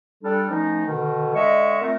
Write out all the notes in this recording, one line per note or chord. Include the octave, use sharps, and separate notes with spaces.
G3 D4 A4
D#3 F3 A3 C#4 D#4
B2 D3 D#3
D3 G#3 D#5 E5 C#6
A#2 A3 C4 A#4